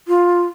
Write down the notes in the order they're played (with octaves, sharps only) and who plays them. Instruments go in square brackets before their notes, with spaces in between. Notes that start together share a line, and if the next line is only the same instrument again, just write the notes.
[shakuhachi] F4